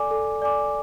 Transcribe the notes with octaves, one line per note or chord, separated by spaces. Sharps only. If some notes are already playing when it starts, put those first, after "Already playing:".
Already playing: A4 D5 G#5 D6
A4
D5 G#5 D6